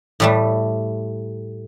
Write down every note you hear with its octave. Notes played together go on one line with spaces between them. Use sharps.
A2 G3 A3